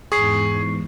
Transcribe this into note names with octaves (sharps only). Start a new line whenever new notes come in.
E2 G#2 G#4 C#6 C7